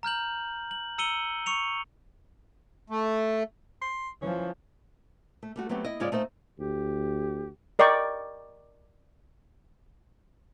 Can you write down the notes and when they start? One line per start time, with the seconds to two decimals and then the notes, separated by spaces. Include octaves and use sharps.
0.03 A#5 F6 G6 F#7
0.71 F#7
0.98 A#5 E6 C#7 D#7 F#7 G7
1.46 C#6 C#7 F7
2.90 A3
3.82 C6
4.22 E3 F3 C#4
5.43 A3
5.56 G3 A3 F#4
5.69 F#3 A3 B3 C4 G4
5.85 E4 D#5
6.00 G#2 C#3 G#3 F4 C#5 D5
6.12 A3 D#4 C5 D5 F5
6.59 D2 G4
7.79 A#4 D5 D#5 G5 C#6